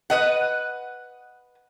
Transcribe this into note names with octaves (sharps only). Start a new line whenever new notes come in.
B4 D#5 F#5